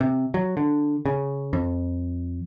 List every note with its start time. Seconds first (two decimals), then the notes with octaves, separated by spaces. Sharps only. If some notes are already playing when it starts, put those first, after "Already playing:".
0.01 C3
0.34 F#3
0.57 D3
1.06 C#3
1.53 F2